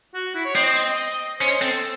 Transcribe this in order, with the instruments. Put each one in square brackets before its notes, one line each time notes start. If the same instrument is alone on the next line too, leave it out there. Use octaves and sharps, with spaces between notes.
[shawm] F#4
E4
C#5
[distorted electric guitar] C4 [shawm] D#5
[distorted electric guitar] C#4 [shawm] C5
[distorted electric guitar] C4 [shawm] A4